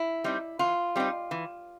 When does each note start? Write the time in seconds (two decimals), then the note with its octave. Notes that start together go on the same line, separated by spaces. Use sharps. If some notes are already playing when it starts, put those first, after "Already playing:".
Already playing: E4
0.24 G3 C4 D#4
0.59 E3 F4
0.96 G3 C4 D#4
1.31 E3